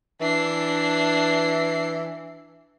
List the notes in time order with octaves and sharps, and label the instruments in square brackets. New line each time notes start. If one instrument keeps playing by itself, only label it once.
[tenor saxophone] E3 [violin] D4 C7